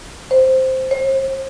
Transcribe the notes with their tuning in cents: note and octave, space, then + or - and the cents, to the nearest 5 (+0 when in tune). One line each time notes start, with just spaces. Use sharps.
C5 +0
C5 +40